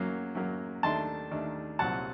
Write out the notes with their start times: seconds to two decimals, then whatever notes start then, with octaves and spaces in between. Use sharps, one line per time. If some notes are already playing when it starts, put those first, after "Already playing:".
Already playing: F#2 F#3 A#3
0.35 F#2 F#3 A#3
0.83 D#2 D#3 A3 D4 A5 C6
1.31 D#2 D#3 A3 D4
1.79 C2 A#2 F#3 F#5 A5